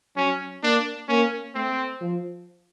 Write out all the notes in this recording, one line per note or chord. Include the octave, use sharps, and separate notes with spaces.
F#3 C#4
A#3 D4
A#3 C#4
A3 C4
F3